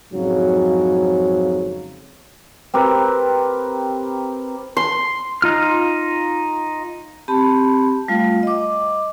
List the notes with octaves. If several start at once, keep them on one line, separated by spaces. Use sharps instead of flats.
F2 G#2 C#3 F#3
C4 G4 A#4 B4
C6
D#4 F4 F6
C4 G4 A5 B5
G3 A3 F4 F5
D#5 D6